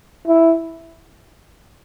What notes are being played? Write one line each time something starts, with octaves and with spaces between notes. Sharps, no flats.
E4